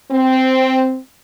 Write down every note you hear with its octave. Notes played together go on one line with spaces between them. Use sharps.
C4